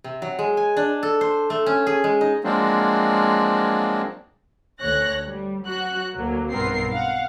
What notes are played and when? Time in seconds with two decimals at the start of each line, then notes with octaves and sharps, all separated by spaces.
0.04 C3
0.22 F#3
0.39 G#3
0.57 G#5
0.77 D4
1.03 A4
1.21 C5
1.50 A3
1.66 C#4
1.87 G#4
2.04 G#3
2.21 D#4
2.44 F3 F#3 G#3 A#3 C4 D4
4.81 D2 C#5 F#6 A#6
5.27 G3
5.64 F#3 F#4 F#6
6.16 D2 F#3 A#3
6.51 B1 G2 B3 C4 A#4 C7
6.92 F5 F#5